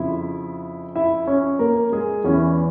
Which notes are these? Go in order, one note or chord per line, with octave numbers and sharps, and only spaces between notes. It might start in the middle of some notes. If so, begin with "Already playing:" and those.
Already playing: F2 C#3 F3 E4 E5
E4 E5
C#4 C#5
A#3 A#4
G#3 G#4
E2 E3 C#4